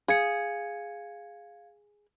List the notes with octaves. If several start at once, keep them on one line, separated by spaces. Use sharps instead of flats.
G#4 F5 G#6 C#7